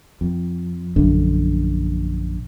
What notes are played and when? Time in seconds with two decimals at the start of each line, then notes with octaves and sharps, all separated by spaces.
0.21 F2
0.96 A#1 F#2 D3 D4